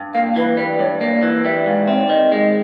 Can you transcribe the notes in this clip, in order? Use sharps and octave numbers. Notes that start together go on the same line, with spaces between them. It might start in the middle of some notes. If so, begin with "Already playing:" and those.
Already playing: G2
A#3 F5
E3 B4
G3 B4
G2 C#5
A#3 D5
E3
G3 E5
G#2 F5
C4 E5
C#5
D5
D#3 D#5
G#3